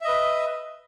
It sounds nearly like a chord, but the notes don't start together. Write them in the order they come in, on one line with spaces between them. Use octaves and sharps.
E5 D#5 B4